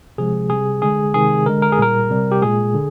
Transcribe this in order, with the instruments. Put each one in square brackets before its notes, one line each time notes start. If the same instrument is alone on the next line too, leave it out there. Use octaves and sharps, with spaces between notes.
[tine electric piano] C3 F3 G#3 G#4
C3 G3 G#4
D3 G#3 G#4
C3 D#3 G#3 G#4
D3 G#3 A#4
A#4
G#4
A#2 G3 A#4
C3 G3
G4
A#2 G#3 G#4
D3